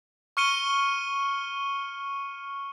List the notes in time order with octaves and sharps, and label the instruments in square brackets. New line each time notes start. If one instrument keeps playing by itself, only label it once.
[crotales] C#6 F6 C#7 D#7 G7